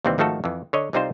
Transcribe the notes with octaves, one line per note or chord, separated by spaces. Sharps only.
D#2 C3 E3 G3 C4
G#1 D#3 F3 A3 F#4 A4
F2 E3
D3 C#5 D#5
C2 G3 C4 D#4 F4 C5